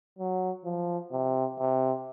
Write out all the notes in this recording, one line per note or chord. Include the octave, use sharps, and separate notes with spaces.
F#3
F3
C3
C3